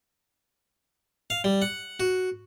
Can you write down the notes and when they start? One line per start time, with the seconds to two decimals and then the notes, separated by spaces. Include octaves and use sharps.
1.30 F5
1.44 G3
1.62 F#5
2.00 F#4